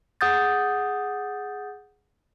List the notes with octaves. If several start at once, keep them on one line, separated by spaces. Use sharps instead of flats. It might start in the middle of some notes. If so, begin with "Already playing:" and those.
G#4 F#5 D#6 G6 A6